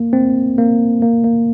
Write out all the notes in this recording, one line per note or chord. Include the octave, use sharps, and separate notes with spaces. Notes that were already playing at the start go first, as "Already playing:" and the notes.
Already playing: A#3
C4
A#3
A#3
A#3